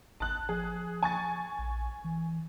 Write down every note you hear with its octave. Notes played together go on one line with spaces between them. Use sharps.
G#1 A5 F#6
F3 G#4
G#5 C#6 A6
A#1
E3